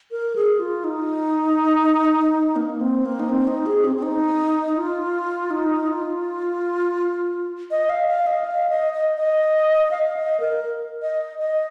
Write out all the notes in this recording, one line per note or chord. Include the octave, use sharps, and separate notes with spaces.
A#4
G#4
F4
D#4
A#3
C4
A#3
D#4
C4
D#4
G#4
C4
C4
D#4
F4
D#4
F4
D#5
F5
F5
D#5
F5
D#5
D#5
D#5
F5
D#5
A#4
D#5
D#5